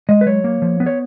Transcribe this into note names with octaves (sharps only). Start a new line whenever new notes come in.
G#3 D#5
B4
F#3 C#5
A#3
F3
B3
C#5